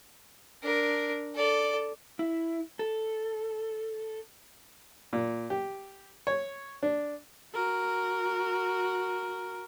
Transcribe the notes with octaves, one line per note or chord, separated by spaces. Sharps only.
D4 A#4
A4 D5
E4
A4
A#2
G4
C#5
D4
F#4 A#4